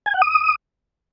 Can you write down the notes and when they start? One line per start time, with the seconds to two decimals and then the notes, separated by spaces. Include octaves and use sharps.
0.06 G#5
0.14 F#5
0.22 D#6